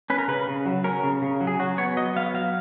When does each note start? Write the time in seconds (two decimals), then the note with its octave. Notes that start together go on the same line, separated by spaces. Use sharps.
0.10 C#4 B4
0.18 A#4
0.28 C#3 B4
0.47 C#3
0.66 F#3
0.84 C#4 A#4
1.04 C#3
1.22 C#3
1.41 F#3
1.47 G#4
1.60 F#3 F#4
1.78 B3 C#5
1.97 F#3 D#5
2.16 B3 F5
2.34 F#3 F5